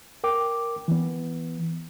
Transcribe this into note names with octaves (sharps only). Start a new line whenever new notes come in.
A#4 G5 D6
E3 B3